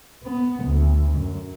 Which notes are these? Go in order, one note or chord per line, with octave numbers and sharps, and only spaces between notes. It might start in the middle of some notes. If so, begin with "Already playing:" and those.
B3
D2
F#2